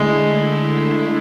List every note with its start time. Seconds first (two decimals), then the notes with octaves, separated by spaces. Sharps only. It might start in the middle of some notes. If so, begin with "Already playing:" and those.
Already playing: D3 G#3 A3 E4